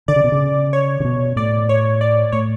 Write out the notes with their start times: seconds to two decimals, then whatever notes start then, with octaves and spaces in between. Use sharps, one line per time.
0.08 D3 D5
0.16 C#3
0.24 B2
0.32 C#3
0.73 C#5
1.00 C#3
1.05 B2
1.36 A2 D5
1.69 C#5
2.01 D5
2.32 A2 C#5